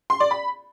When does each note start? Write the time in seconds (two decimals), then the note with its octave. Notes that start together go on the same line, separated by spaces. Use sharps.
0.10 C6
0.20 D5
0.31 B5